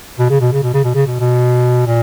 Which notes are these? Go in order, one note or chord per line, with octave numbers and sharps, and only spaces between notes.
B2
C#3
B2
C#3
B2
C#3
B2
C#3
B2
B2
A#2